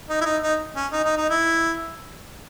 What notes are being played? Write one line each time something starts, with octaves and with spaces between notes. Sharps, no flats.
D#4
E4
D#4
D#4
C#4
D#4
D#4
D#4
E4